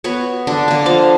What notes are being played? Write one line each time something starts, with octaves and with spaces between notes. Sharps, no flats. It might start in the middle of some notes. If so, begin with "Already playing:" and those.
B3 F#4 C#5
D3 D4
D3 A#3
F3 A4 F5